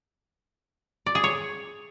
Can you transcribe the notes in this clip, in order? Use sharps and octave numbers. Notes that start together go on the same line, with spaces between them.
D5
G#4
C#5